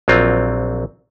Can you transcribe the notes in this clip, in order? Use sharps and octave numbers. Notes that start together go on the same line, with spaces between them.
A#1 F#3 C4 F4